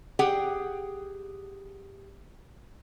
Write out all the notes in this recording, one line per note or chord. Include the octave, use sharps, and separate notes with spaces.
G4 G#4 F#5 G5